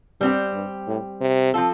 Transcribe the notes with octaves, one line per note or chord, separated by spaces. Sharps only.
G2 G3 C4 G4
G2
A2
C3
F3 C4 F4 A4